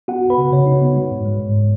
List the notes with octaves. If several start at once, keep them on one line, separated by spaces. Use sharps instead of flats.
B3 F#4 F#5
B3
B4 B5
C#3
C#3 C#5
D#4
B3
G#3
G#2
G#3
G#2